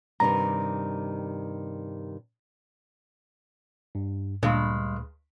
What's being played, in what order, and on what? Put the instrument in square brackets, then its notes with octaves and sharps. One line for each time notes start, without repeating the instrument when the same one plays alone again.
[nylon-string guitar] G2 C3 D#3 [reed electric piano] A#5
[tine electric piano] G2
[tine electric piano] D2 [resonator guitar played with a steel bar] G2 G#3 [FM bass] A#2